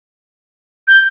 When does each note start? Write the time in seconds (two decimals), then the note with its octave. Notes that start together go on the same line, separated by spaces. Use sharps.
0.88 G6